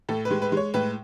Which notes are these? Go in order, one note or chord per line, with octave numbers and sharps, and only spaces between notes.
A2 A4
B4
G#3
B4
G#3 C#5
A2 B4